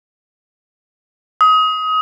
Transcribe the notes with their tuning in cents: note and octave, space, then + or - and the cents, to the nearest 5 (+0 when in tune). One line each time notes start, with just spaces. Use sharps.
D#6 +25